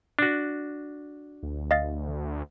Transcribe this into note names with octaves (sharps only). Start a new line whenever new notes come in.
D4 F#4
D2
D#5 F5 A6